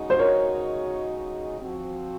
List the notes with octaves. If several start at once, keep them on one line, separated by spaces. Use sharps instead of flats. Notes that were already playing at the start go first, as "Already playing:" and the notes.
Already playing: C#3 G#3 D#4 F#4
C5
A#4 C#5
F3 C4 F#4